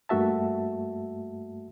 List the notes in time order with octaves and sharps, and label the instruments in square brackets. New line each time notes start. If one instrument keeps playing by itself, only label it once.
[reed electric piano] G2 A3 A#3 F#4 E5 A5